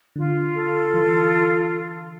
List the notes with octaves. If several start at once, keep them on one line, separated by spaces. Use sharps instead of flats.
D3 F4
A4
E3 F4